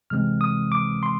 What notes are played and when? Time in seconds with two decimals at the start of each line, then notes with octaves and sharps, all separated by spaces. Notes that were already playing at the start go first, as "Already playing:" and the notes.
0.10 C3 E3 G#3 C4 F6
0.41 D#6
0.72 D6
1.03 C6